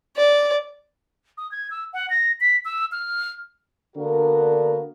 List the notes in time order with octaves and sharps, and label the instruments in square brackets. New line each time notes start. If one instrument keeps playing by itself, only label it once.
[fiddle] D5
[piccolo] D#6
G#6
E6
F#5
A#6
B6
E6
F6
[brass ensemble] D3 A#3 B3 D4 F#4 A#4